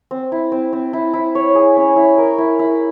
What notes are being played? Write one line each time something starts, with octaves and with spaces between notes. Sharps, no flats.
C4
E4
C4
C4
E4
E4
C#5
G#4
C#4
E4
A#4
E4
E4